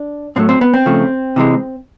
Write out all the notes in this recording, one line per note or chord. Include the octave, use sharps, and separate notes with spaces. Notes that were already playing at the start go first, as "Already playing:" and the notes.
Already playing: D4
A2 F#3 A3 C4
C4
B3
C4
C#3 F3 A3
C3 E3 G#3